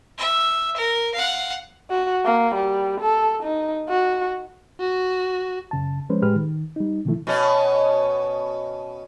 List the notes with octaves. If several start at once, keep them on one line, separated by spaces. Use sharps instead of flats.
E5
A#4
F5 F#5
F#4
A#3
G3
A4
D#4
F#4
F#4
F#2 C#3 A5
F3 G#3 C#4 B4 C5
A2 G#3 G4 B4 F6
D#3
G3 D#4
B2 D3 D#3 F3 A3 E4
B2 C#4